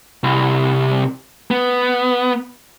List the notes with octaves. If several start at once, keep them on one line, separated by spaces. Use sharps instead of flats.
C2
B3